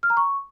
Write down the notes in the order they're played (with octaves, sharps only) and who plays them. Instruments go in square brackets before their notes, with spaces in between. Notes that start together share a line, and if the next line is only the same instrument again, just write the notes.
[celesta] F6
A#5
C#6